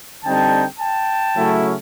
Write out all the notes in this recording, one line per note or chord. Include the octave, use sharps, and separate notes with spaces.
D3 G3 C4 D#4 G5 A5
G5 A5
C#3 F#3 A3 C#4 E4